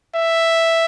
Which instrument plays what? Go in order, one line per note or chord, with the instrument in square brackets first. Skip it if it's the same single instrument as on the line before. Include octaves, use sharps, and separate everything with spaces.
[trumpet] E5